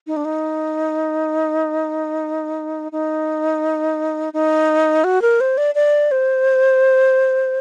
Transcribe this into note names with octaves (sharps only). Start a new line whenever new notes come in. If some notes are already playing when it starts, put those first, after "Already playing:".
D#4
D4
D#4
D#4
D#4
F#4
A#4
C5
D5
D5
C5